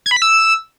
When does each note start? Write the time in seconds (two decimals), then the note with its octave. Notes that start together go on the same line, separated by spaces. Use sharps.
0.06 G#6
0.11 B5
0.16 B6
0.22 E6